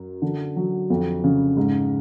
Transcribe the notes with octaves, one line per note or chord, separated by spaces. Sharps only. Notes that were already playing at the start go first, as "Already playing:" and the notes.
Already playing: F#2
D3
F#3
F2
C#3
G#2